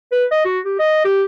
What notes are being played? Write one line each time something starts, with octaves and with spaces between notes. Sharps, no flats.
B4
D#5
F#4
G4
D#5
G4